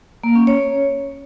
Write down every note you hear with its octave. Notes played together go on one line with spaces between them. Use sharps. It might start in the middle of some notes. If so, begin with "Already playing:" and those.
A#3
C#4
C#5